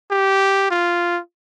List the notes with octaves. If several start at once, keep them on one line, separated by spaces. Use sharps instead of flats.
G4
F4